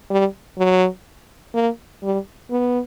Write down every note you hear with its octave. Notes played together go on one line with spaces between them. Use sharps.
G3
F#3
A#3
G3
B3